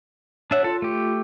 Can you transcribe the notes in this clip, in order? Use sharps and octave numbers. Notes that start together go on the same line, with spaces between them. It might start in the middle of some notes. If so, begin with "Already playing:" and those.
D4 C#5 E5 F#5
F4 A4
A3 G4